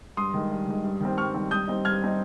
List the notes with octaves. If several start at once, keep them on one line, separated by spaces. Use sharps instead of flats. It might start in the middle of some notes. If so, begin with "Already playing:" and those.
G2 C6 D#6
D#3 G#3
G2
D#3 G#3
G2
D#3 G3 C4
G2 C#6 F6
D#3 G3 C4
G2 D#6 G6
G3 C4 D#4
G2 F6 G#6
G3 C4 D#4